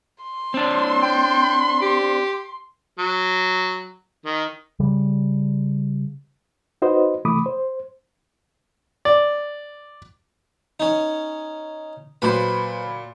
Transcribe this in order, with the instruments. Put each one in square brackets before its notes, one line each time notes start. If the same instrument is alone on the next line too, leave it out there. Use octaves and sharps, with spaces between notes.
[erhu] C6
[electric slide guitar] C4 D4
[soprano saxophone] G5
G4
[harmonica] F#3
D#3
[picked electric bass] C#3 G3
[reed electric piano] D#4 F#4 B4 C5 D#5
C3 E3 A3 B5 D6 D#6
C5
[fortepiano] D5
[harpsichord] C#4 D#4
[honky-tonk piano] A#2 F#3 B5 [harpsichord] B4 C5